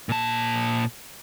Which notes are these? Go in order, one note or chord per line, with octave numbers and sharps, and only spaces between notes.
A#2 A5